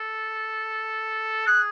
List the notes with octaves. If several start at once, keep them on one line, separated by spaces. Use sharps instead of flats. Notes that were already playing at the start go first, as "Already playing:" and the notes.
Already playing: A4
G#4 F#6